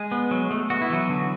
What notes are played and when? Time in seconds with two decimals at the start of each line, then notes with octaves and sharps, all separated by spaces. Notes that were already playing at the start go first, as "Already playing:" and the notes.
Already playing: G#3 G#4
0.12 B3
0.31 F#3
0.51 A3
0.70 B3 F#4
0.82 E4
0.90 E3 F#3 F#4
1.09 D3